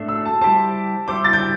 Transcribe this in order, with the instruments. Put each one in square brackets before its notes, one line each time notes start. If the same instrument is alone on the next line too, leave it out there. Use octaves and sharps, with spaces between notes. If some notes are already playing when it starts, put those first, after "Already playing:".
Already playing: [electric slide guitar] A2 A3 D4
[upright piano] E6
A5
[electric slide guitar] G3 E4 G4 C5 [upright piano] A5
[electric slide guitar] G3 E4 G4 C5 [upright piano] D6
[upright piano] A6
G6